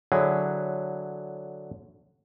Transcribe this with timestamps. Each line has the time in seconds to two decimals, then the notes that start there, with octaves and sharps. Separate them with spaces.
0.12 D3 F#3 E4 G#4